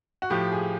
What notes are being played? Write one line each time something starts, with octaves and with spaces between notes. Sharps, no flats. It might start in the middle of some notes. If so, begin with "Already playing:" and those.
F#4
A2 F3 G4
G#4